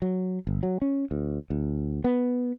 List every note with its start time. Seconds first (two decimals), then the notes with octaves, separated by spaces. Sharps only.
0.02 F#3
0.47 G1
0.63 F#3
0.82 C#4
1.11 D2
1.50 D2
2.04 B3